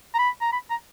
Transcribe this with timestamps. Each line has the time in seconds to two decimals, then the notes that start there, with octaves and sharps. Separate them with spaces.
0.14 A#5
0.19 B5
0.41 A#5
0.52 B5
0.70 A#5